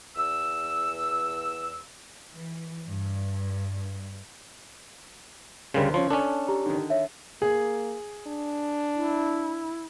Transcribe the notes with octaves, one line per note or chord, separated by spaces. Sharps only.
E2 E6
E3
G2
D2 C#3 G3 A#4 C5
C#3 F3 C#5 C6
C#4 D4 A4
G4 A#5
D3 D#3
C#5 E5
A#3 G#4
D4
E4